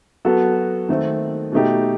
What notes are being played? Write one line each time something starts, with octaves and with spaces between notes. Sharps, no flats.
F#3 B3 F#4 A4
D#3 A3 C4
B2 A3 D#4 G4